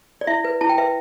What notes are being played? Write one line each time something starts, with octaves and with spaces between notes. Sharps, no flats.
D5
E4 E5
B4
E4 A5
G5
B4 E5